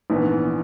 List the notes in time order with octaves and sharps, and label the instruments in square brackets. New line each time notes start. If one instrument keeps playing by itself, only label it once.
[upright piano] A#1 G#2 E3 B3